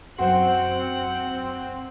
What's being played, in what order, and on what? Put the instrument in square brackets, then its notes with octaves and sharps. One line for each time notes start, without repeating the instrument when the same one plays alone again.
[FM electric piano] F#2 C6 [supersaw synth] C4 [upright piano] F#4 C5 [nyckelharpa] F#5 G5